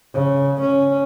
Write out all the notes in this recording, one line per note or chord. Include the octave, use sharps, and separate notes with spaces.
C#3
C#4